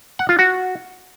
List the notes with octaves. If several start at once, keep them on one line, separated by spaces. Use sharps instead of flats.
F#5
F4
F#4